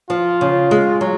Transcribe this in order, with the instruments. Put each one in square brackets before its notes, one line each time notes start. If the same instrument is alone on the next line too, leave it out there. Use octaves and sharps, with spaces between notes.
[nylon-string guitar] F3 [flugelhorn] F4
[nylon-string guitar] C#3
G#3
F#3